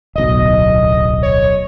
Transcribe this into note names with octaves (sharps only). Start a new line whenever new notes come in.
D1 B1 D#5
C#5